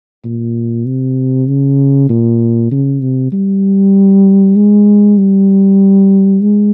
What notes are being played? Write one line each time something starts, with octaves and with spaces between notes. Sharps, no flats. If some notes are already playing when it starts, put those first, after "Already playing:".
A#2
C3
C#3
A#2
C#3
C3
G3
G#3
G3
G#3